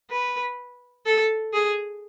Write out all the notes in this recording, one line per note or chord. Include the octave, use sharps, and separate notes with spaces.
B4
A4
G#4